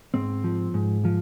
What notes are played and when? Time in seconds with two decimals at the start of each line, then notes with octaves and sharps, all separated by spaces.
0.14 G#2 C4
0.44 F3
0.74 G#2
1.05 F3